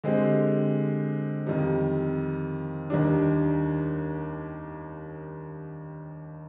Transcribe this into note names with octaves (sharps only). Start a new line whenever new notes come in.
D3 G#3 C4 G4
F2 D#3 G3
D#2 D#3 G3 D4